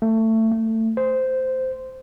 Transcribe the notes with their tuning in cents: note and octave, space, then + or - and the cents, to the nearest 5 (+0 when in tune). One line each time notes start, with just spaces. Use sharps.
A3 +20
A3 +20
C5 -10